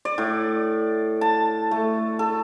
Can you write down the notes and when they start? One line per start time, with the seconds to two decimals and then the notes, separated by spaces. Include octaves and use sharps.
0.05 D5
0.18 A2
1.21 A5
1.71 A3
2.19 A4